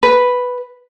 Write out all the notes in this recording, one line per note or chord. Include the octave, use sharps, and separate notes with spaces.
B4